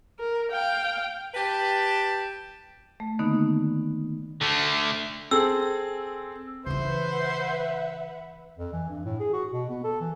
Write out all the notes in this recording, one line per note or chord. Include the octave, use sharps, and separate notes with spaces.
A#4
F5 G5
G4 B4 G5 A5
A3
D3 D#3 A#3 B3 D#4
D3 A3
C4 G#4 A4 E6
C#3 E3 B4 C5 E5 F#5
F2
E3
G2
A2
G#4
F#4
B2
B3
A4
E3